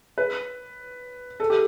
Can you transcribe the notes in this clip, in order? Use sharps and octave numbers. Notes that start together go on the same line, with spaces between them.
B4
A4
G4